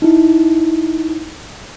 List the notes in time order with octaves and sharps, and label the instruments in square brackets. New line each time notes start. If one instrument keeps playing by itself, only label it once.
[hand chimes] D#4 E4